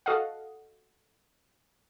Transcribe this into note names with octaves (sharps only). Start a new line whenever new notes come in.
F#4 A4 D#5 F5 F#5